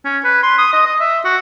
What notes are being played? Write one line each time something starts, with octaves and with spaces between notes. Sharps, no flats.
C#4
B4
C6
D#6
D#5
D#5
E5
F#4